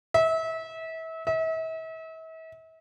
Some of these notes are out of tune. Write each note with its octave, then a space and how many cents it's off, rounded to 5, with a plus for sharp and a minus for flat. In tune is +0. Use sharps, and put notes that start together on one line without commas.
E5 -30
E5 -40